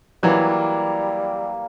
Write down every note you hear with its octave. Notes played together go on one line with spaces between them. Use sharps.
E3 F#3 G3 A#3